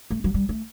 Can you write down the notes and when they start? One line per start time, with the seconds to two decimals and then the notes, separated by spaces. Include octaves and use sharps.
0.11 A3
0.24 F#3
0.34 G3
0.49 A3